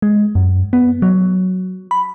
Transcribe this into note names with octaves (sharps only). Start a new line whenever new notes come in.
G#3
F#2
B3
F#3
B5